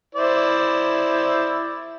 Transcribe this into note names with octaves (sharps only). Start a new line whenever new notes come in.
E4 C5 D5